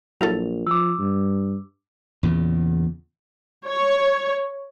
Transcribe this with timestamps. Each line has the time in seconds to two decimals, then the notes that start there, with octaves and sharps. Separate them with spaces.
0.21 A#1 F#3 E4 A4 F7
0.67 F3 D6 E6
0.99 G2
2.23 E2 A#2 C#3
3.67 C#5